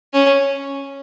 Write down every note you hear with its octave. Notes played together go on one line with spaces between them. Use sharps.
C#4